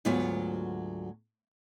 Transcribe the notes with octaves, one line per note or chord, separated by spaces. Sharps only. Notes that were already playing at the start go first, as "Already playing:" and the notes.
D2 G#2 F#3 B3 F4 C#5